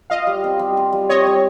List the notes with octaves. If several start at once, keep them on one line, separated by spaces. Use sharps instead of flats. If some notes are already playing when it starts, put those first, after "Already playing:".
F4 D#5 F5
G3
C4
G3
F4
G3
C4 C#5 D#5
G3